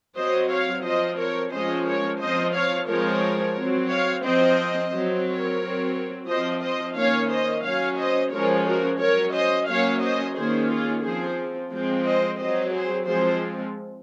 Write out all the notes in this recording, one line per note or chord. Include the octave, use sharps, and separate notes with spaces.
F#3 C4 C5 D#5
C#5 F5
F3 C4 C5 D#5
A#4 C#5
F3 G#3 C#4 C5 D#5
A#4 C#5
F3 C4 C5 D#5
C#5 F5
F3 G#3 C4 A#4 C#5
F#3 C4
C#5 F5
F3 C4 C5 D#5
F#3 C4
A#4 C#5
F#3 C4
F3 C4 C5 D#5
C5 D#5
D#3 A#3 C#4 C#5 F5
C5 D#5
F#3 C#4 C#5 F5
C5 D#5
F3 G#3 C#4 A#4 C#5
F#4 A#4
F#3 C#4 A#4 C#5
C5 D#5
F#3 A#3 C#4 C#5 F5
C5 D#5
D#3 A#3 C#4 G#4 C5
F4 G#4
F3 C4 G#4 C5
F3 G#3 C4
C5 D#5
F#3 C4 C5 D#5
G#4 C5
F3 G#3 C4 G#4 C5